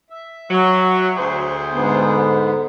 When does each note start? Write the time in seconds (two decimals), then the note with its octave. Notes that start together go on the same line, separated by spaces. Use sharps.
0.10 E5
0.50 F#3
1.17 D2 G#4 C5
1.73 G#2 D3 B3